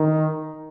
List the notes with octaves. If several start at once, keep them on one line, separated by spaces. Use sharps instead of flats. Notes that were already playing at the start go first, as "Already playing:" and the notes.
Already playing: D#3